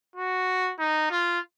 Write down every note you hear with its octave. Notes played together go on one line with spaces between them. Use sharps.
F#4
D#4
F4